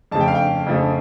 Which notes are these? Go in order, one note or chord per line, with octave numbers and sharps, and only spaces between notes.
F2 C#3 F3 A3 A5
G5
F5
G5
F2 C#3 F3 A3